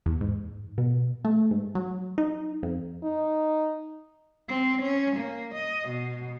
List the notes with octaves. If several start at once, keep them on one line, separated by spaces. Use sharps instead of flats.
E2
G#2
B2
A3
G#2
F#3
D#4
F2
D#4
C4
C#4
A#3
D#5
B2